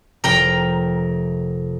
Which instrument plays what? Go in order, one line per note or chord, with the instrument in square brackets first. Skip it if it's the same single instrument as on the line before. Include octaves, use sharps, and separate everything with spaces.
[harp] F1 [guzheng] A#4 G5 A#5